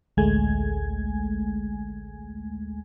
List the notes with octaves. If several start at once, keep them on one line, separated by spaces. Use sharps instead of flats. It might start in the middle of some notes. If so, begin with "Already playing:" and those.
A1 D2 G#3 A3 G#5 G#6